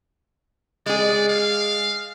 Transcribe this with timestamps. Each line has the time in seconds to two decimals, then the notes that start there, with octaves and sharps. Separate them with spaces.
0.86 G#3 G#4 D5
1.28 F5